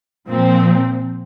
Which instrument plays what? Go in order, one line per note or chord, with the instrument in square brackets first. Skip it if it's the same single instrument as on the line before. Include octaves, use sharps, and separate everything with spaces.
[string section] A#2 F3 C4